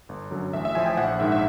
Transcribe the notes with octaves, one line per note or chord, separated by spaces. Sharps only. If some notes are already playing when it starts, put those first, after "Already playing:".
G1
F#2 D3 F#3
A1 E5
E5
A2 F3 G#5
G5
A#1 F#5
G#2 D#3 E5
E5